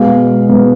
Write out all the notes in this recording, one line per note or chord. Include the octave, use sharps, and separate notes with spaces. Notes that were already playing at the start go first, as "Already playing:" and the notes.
Already playing: B2 G#3 B3 F5
B2 G#3 B3